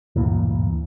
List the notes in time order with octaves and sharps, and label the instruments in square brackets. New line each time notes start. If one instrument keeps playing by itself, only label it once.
[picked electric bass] D2 G2 A#2 E3